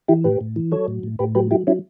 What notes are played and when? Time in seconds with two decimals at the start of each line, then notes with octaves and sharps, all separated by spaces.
0.08 E3 E4 G4
0.24 A2 G4 B4
0.41 A2
0.56 E3
0.72 F#3 A4 C#5
0.88 A2
1.03 A2
1.19 A2 G4 B4
1.35 F#3 G4 B4
1.51 F#3 E4 G4
1.67 F#3 C#4 E4